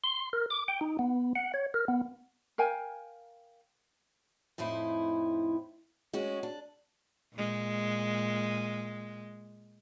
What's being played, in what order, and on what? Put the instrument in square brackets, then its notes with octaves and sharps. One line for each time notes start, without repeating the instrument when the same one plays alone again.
[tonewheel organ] C6
A#4
D6
G5
D#4
B3
F#5
C#5
A#4
B3
[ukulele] A#4 F5 G5 G#5
[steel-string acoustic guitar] F2 A2 D#4 E4 C5
G#3 C#4 F#4
D4
[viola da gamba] A#2 G#3